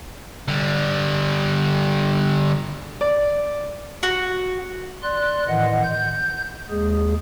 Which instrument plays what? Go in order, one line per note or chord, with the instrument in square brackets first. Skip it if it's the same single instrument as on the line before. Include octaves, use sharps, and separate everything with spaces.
[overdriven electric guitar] D3 G3
[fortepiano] D5
[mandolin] F#4
[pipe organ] D5 C6 F#6
A2 D#3 E3 D#5 F#5
G6
D#2 G#3 G#4